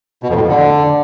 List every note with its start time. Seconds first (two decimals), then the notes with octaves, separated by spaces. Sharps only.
0.23 B2
0.29 F2
0.36 A2
0.42 F2
0.48 D3